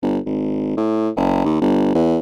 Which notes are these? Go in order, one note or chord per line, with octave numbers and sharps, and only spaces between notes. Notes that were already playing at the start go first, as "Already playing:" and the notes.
G1
G#1
A2
F#1
D#2
G1
E2